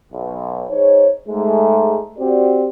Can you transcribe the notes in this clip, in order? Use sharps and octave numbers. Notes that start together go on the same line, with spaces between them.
B1
D#4 G#4 C5 C#5
G#2 G#3 A3
C4 F#4 G4 C5 D5